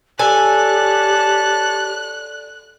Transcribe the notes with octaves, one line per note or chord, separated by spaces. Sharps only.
G4 A4 C#5 D5 G#5 A5 F#6